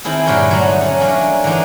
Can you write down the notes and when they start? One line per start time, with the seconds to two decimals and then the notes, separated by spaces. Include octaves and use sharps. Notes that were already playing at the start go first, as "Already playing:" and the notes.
0.04 D#3 C4 E4 G#4 A4
0.26 G2 A#2 D3 A#4 C#5 G5
0.51 F#3 A3 D#4
0.81 C#4
1.00 A3 A#3 C#4 D4
1.44 D3 E3 G#3 D4 D#4